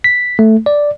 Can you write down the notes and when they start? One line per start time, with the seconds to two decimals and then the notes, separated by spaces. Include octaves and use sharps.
0.04 B6
0.39 A3
0.66 D5